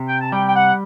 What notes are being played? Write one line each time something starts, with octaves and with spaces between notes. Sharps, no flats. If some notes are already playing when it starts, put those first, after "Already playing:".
Already playing: C3
G5
A5
G3 G5
G5
F#5